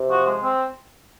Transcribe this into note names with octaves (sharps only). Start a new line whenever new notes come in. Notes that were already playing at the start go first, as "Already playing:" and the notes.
Already playing: C3
F3 F#4
G#3
C4